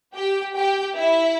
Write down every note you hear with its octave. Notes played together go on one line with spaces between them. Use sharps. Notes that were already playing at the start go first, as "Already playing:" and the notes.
G4 G5
G4 G5
E4 E5